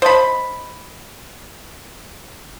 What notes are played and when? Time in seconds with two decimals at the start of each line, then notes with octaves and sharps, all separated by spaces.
0.02 C5 D#5 A5 B5